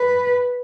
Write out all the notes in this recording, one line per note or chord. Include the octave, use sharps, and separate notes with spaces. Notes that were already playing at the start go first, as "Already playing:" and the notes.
Already playing: B4